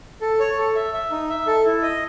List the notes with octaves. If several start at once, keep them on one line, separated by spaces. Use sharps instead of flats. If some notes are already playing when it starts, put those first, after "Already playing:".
A4
C#5
A4
E5
E5
D#4
E5
A4
E4
D#5